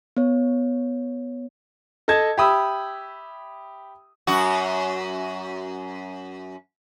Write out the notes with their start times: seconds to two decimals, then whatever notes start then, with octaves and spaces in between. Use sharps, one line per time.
0.17 B3 C#5
2.08 A4 D#5 A5 G#6
2.37 G4 E5 B5 D#6 E6
4.27 F#2 F#4